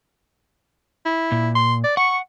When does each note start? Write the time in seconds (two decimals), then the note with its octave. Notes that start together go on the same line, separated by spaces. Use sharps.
1.06 E4
1.32 A#2
1.55 C6
1.84 D5
1.97 F#5 C#6